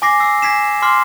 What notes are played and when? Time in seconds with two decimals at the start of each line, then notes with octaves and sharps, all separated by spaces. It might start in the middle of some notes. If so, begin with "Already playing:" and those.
0.02 G#5 D6 A#6 C7
0.20 D6 E6 C7
0.42 G#5 G#6 B6 C7 E7
0.82 C6 D6 F6 C7